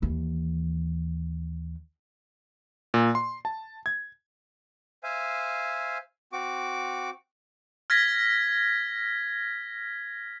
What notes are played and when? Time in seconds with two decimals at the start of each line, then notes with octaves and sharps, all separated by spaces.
0.02 D#2 E3
2.94 A#2
3.15 C6
3.45 A5
3.86 G#6
5.03 C5 E5 F5 G#5
6.33 C4 F#4 D6
7.90 F6 G#6 A#6 B6